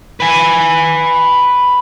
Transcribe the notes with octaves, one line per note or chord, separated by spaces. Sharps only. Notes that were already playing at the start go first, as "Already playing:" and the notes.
B4 G#5